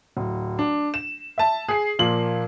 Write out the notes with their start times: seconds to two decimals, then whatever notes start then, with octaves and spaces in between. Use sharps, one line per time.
0.17 D1
0.59 D4
0.94 E7
1.38 E5 A5
1.68 G#4 C7
1.99 A#2 F3 A#3 F#7